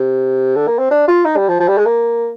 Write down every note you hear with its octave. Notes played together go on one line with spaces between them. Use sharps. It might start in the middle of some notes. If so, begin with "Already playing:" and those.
Already playing: C3
D3
A#3
C4
D4
F4
D#4
G3
F3
F3
G3
G#3
A#3